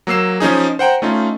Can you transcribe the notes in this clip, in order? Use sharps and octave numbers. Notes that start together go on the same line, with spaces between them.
F#3 A#3 E6 C7 E7
F3 C#4 D#4 G#4
C5 F#5 G5 A#5
A3 C#4 D#4 F4